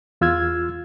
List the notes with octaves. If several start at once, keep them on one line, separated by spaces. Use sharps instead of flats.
E2 F4 E6 F6 G#6